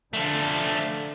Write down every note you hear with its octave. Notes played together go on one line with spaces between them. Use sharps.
D3 F3 A3